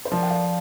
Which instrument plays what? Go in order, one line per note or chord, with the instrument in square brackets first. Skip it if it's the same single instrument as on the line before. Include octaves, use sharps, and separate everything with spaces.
[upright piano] C5
[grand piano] F3 [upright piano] A#4 D5
[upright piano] G5
D5 F5